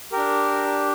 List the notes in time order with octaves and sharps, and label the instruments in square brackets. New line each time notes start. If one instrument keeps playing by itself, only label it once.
[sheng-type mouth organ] D4 G4 A#4